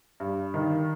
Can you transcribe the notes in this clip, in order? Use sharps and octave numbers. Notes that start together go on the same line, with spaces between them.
G2
D#3